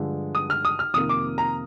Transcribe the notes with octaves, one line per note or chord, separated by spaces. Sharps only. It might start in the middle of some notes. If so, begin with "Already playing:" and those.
Already playing: G2 D3 F3 G#3
D#6
F6
D#6
F6
F2 C3 D#3 A#3 D#6
D6
A#5